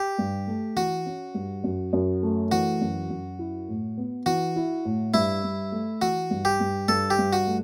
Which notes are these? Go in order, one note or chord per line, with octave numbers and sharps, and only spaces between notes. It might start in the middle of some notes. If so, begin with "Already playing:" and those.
Already playing: G4
G2
A3
E3 F#4
C#4
G2
F#2
F#2
A3
E3 F#4
F#2
F#2
E4
A2
B3
E3 F#4
E4
A2
G2 E4
G2
A3
E3 F#4
G2
G4
G2
G2 A4
G4
G2
F#4
A3